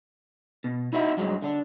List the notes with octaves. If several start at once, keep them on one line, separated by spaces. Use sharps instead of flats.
B2
D#4 E4 F#4 D#5 E5
G2 F#3 G#3
D3 D4